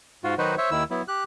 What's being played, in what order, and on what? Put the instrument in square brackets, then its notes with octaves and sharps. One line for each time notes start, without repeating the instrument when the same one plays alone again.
[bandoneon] G#2 F4 F#4
D#3 F#3 D#4 F#4 B4 C5
C5 C#5 E5
D#2 D#3 E4 E6
F#3 B3 E4
G4 F#6